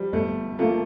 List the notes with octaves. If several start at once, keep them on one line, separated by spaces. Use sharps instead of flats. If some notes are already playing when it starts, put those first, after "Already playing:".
Already playing: F3 G3
G1 A3
F3 A3 A#3 F4